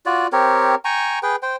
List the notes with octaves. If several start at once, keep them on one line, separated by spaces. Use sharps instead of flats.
F4 F#4 D5
C4 G4 A#4 C#5
G5 G#5 A#5 C#6
G#4 B4 G5
C5 G5